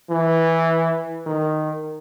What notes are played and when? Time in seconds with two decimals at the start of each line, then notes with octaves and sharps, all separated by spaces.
0.10 E3
1.27 D#3